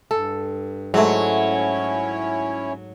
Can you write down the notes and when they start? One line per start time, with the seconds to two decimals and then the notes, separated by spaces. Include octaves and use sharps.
0.11 G2 A4
0.94 G#2 F#3 A3 C#4 E4 C#5